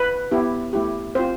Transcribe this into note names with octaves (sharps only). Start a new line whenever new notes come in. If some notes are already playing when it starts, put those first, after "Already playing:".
Already playing: B4
B3 E4 G4
A3 E4 G4
C4 F4 C5